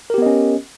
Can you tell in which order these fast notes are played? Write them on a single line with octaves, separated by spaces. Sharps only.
A#4 G4 B3 D#5 C#4